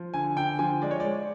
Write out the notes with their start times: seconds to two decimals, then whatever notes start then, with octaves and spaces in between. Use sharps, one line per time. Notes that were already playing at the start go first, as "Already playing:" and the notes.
Already playing: F3
0.14 D3 G#5
0.36 D3 G5
0.59 F3 G#5
0.82 G#3 D5
0.91 C#5
1.00 D5
1.05 G#3